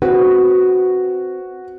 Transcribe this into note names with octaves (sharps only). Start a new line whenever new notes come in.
C4 F#4 B4